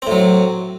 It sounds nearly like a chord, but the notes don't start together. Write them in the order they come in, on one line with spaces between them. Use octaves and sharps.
C4 A2 F#3